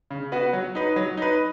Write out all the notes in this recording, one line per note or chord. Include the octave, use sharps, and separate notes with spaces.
C#3
B3 F#4 B4
F#3
D#4 B4
F#3
D#4 B4